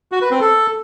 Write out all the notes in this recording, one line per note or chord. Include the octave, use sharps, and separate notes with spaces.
F#4
B4
C4
A4